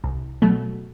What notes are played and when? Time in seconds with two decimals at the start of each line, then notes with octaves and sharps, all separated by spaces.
0.04 C2
0.42 B2 F#3 A3